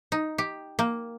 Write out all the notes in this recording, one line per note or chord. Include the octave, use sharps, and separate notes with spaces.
D#4
G4
A#3